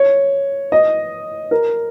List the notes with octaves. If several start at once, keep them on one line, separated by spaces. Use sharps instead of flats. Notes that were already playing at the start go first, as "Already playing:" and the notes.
Already playing: C#5
D#5
A#4